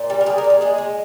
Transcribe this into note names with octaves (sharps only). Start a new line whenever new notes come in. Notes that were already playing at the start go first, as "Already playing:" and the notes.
Already playing: A#2
G3
A#4
G3 G#4
A#4
A#2
G#4
G#3 G#4
G#3